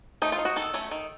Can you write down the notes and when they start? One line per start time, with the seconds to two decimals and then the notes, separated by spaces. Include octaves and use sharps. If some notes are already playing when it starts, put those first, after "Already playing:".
0.22 A3 D#4
0.32 F4
0.38 D#4
0.45 F#4
0.56 D#3 A4
0.74 F#3 A3 C#4
0.91 D#3